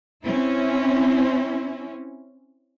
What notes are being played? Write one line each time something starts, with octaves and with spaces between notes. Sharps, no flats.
C4 C#4 E4